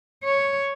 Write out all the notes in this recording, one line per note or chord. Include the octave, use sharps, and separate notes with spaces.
C#5